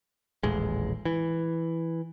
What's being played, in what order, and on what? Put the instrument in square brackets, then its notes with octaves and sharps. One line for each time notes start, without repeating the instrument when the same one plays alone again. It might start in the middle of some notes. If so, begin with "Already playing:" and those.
[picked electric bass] D#1 A1 G#3
E3